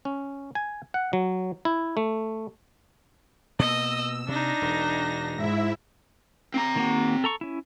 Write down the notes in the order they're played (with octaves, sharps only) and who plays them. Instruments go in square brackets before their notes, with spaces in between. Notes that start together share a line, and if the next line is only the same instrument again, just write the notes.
[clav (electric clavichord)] C#4
G#5
F#5
F#3
E4
A3
[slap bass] B2 A#3 [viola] D#5 [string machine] E6
[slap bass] C3 [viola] D4 D#4 [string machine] A#6
[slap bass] E1
[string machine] G#2 E4 E5
[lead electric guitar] C4 A#5
[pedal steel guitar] D#3 A#3 F#4
A4 A#5 C#6
C#4 E4